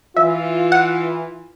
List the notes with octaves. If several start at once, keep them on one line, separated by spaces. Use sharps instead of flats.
E3 F4 E5
F#5